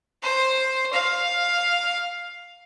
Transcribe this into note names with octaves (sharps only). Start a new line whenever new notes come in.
C5
F5